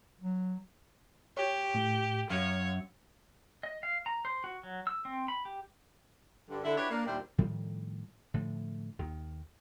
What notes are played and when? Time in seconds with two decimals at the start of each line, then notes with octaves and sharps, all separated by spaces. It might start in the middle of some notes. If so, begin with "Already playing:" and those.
0.21 F#3
1.37 G4 C#5
1.74 A2
2.30 F#2 C#5 F5 G#6
3.63 D#5
3.83 F5
4.06 A#5
4.25 C5
4.44 F#4
4.63 F#3
4.87 E6
5.05 C4
5.28 B5
5.45 G4
6.50 G2 D3
6.64 D3 E4
6.77 D4 E4 F#4 G4 B4 C#5
6.90 A#3 D4
7.06 D#2 A#2 G3 D4 E4 C5
7.38 A2 D#3 F3 G3
8.34 A2 D3 F3
8.99 D#2 D#3